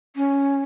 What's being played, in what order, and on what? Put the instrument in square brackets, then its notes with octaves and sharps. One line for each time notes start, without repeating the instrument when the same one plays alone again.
[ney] C#4